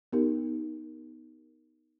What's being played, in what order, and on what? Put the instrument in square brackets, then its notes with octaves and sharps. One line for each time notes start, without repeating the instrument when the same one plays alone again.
[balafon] B3 D#4 G4 A#4